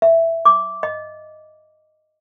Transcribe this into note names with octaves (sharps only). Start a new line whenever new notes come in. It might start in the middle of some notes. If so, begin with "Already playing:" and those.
E5
D6
D#5